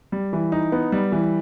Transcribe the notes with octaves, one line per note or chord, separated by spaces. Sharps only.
G3
E3
D#4
B3
G3
E3